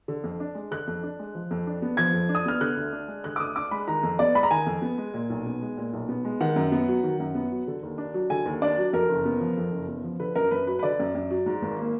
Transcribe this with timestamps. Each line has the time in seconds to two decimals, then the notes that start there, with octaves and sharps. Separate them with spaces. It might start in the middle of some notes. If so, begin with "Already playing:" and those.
0.08 D3
0.24 F2
0.40 D4
0.55 G#3
0.71 D3 F#6
0.87 F2
1.03 D4
1.19 G#3
1.35 F3
1.51 F2
1.67 D4
1.82 B3
1.97 F3 G#6
2.13 F2
2.29 D4
2.35 D#6
2.46 B3 F6
2.61 D3 F#6
2.77 D2
2.93 D4
3.08 G#3
3.24 D3 F#6
3.36 D6
3.40 D2 D#6
3.56 D4 D6
3.71 G#3 B5
3.88 D#3 A#5
4.03 F2
4.19 B3 D5
4.35 G#3 B5
4.43 A#5
4.51 D#3 G#5
4.66 F2
4.82 B3
4.98 G#3
5.14 A#2
5.30 B1
5.46 B3
5.61 G#3
5.78 A#2
5.93 B1
6.09 B3
6.25 G#3
6.40 D#3 F#5
6.56 F#2
6.72 B3
6.88 F#3
7.04 D#3
7.20 F#2
7.35 B3
7.51 F#3
7.67 D3
7.83 D#2
7.98 D4
8.14 F#3
8.30 D3 G#5
8.46 D#2
8.62 D4 D5
8.78 F#3
8.93 F2 A#4
9.09 F#1
9.25 B3
9.41 F3
9.57 F2
9.72 F#1
9.88 B3
10.04 F3
10.20 D3 B4
10.35 F#2 A#4
10.51 F#2 B4
10.67 F#3 B4
10.79 B4
10.83 D3 D5
10.99 F#2
11.15 F#2
11.31 F#3
11.46 G#2
11.62 G#1
11.78 A#3